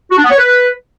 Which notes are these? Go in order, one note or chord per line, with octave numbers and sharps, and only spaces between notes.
F#4
D4
B3
C#5
B4